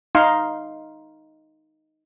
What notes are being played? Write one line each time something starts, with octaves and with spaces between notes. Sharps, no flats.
D#4 F5 C6